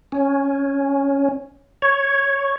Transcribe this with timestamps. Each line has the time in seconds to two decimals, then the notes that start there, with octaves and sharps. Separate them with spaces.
0.12 C#4
1.82 C#5